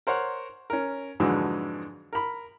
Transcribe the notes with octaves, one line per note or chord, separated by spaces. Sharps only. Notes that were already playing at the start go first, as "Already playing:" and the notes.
A#4 C5 C#5 F#5
C#4 A#4
F2 G#2 D3 E3 F#3 G#3
A#4 B5